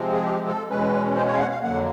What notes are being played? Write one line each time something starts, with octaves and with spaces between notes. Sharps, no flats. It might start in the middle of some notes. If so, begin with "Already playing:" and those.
Already playing: C3 F3 G#3 C4
G#4
G4
A4
E2 B2 G#3 C#4 B4
C5
C#5
F5
F#5
F5
F2 D3 F#3 A#3 F#5